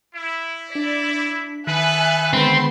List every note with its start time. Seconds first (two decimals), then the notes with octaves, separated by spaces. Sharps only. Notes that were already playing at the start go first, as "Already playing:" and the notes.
0.14 E4
0.72 D4 D5 B6
1.67 D#3 B3 A4 B4 E5 G#5 F#6
2.33 D3 D#3 G#3 A3 B3 C4 B5 C6